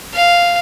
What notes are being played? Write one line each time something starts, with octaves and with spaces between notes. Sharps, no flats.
F5